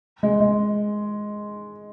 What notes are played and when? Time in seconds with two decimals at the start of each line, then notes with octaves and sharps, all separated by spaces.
0.23 G#3
0.40 G#3